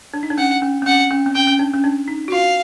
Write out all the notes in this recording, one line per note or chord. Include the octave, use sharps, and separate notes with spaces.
D4
D#4
D4
C#4 F#5
C#4
C4
C#4 F#5
C#4
C4
C#4 G5
C#4
D4
C#4
D4
D#4
F#4
F4 F5